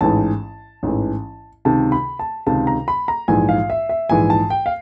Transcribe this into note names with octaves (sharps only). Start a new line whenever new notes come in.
A1 G#2 E3 A5
A1 G#2 E3
C#2 C3 D#3 A5
B5
A5
C#2 C3 D#3 A5
A#5
B5
A#5
A#1 G#2 E3 G#5
F5
E5
E5
A#1 G#2 E3 G#5
A5
G5
F5